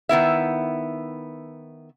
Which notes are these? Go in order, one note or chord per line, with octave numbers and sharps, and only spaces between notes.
D#3 B3 E4 E5